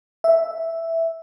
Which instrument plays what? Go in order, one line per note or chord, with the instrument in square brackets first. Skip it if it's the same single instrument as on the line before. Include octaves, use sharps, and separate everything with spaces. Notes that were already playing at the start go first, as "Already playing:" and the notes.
[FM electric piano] E5